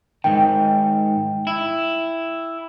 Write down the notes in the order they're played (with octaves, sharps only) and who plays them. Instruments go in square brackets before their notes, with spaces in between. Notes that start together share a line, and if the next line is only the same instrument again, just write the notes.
[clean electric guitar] G#2 D#3 [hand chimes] G5
[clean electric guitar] E4